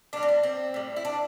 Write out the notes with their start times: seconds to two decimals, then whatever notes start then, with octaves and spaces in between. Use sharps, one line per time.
0.13 A2 G3 D4
0.23 C4
0.29 B3
0.43 C4
0.74 A2 G3
0.96 E4
1.05 D4